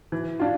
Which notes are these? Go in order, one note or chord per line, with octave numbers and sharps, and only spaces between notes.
E3
D4 F4